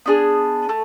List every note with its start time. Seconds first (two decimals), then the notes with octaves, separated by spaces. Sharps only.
0.06 B3 D4 F4 G#4
0.69 A3